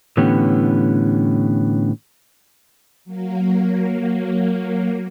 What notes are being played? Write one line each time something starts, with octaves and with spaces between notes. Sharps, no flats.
A2 D3 E3 B3 C#4 G4
F#3 A#3